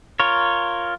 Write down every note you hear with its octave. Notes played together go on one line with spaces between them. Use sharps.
F4 A#4 C#5